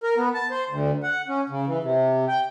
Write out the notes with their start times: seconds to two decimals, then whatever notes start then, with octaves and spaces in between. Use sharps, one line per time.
0.04 A#4
0.17 B3
0.34 A5
0.51 C5
0.69 D2
1.03 F#5
1.28 C#4
1.49 C#3
1.67 E3
1.83 C3
2.28 G5